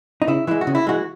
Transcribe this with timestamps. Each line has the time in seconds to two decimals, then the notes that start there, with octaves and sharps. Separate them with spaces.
0.22 D#4
0.28 C#3 E4
0.47 E3 G#3 E4
0.61 F#4
0.67 C#3
0.75 E4
0.87 E3 G#3 F#4